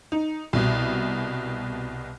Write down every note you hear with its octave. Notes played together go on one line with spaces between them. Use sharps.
D#4
C2 B2